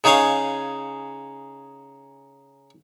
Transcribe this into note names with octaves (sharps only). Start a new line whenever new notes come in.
C#3 D#4 G#4 C#5 F5